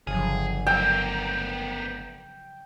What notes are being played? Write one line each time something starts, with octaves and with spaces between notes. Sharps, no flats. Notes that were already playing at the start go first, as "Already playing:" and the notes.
G1 C#3 F3 F#3 G#4
F#3 B3 A#4 G5 E6